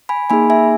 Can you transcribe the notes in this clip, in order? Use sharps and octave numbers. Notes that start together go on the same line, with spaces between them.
G#5 B5
A#3 D#4 G#4 G#5 B5
E5 G#5